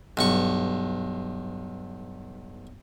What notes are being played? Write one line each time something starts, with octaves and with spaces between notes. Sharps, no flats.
B1 G2 C#6